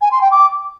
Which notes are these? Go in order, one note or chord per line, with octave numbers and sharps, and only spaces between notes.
G#5
C6
G5
D6